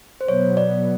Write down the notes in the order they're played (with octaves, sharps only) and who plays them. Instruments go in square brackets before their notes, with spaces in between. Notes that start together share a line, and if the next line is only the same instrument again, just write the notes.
[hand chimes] C5
[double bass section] B2 F#3 B3 [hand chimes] C#5
[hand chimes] D5